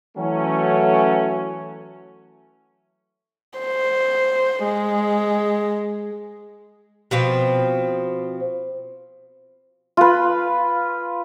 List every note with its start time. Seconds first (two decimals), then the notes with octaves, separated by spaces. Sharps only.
0.17 E3 F#3 A3 C#4
3.59 C5
4.64 G#3
7.11 B2 F3 C4
9.97 F4 B4